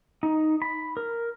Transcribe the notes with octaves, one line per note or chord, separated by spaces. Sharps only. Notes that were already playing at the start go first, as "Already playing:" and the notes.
D#4
B5
A#4